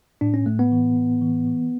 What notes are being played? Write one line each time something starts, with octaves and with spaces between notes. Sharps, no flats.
A2 D4
C#4
A2 A3
B3
E3
A2
E3
E3